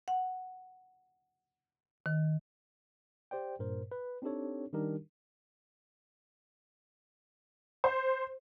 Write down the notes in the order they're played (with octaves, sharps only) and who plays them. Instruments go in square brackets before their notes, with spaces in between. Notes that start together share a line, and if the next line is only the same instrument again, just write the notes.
[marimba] F#5
D#3
[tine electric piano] G4 C5 D5 G5
G2 A#2 A#4 C5
B4
C4 D4 D#4 G4 A4 C#5
D#3 G3 D4 D#4 G4 A#4
[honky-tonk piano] C5